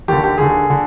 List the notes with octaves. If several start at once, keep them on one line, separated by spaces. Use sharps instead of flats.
D#2 D3 G4
G4
D#2 D3 G#4
D3